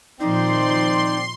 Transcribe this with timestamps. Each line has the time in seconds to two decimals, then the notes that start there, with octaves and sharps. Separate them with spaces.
0.20 A#2 D#3 F3 C4 D#4 C5 D5 C6